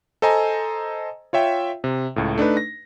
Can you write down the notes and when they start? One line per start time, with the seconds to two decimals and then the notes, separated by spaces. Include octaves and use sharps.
0.22 A4 C5 D#5 G#5 A#5
1.33 F4 C#5 E5 G5
1.84 C3
2.16 C#2 A2
2.38 A3 D4 D#4 B4
2.57 A#6